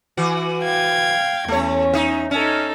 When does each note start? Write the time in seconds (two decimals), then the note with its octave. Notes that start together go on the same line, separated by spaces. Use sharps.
0.17 E3 F#4
0.62 F5 G5 G#6
1.48 E2 A3 C#4 C#5
1.93 D#4 E5
2.31 C#4 D#4 A4